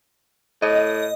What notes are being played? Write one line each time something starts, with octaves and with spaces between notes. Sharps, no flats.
A2 D#5